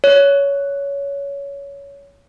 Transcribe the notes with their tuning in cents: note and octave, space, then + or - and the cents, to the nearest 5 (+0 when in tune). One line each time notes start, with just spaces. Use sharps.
C#5 +15